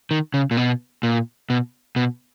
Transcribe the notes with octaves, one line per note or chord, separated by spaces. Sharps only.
D#3
C#3
A#2
B2
A#2
B2
B2